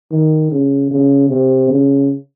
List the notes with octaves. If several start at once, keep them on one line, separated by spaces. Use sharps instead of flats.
D#3
C#3
C#3
C3
C#3